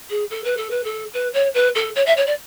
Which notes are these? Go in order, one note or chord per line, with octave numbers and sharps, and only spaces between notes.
G#4
A4
B4
A4
B4
A4
B4
C#5
B4
A4
C#5
E5
C#5
D5